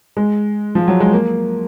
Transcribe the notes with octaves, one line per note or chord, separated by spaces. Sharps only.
G#3
F3
F#3
G#3
A#3